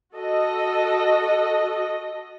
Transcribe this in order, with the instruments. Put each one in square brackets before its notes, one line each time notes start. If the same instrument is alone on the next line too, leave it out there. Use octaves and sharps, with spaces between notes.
[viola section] F#4 A4 D#5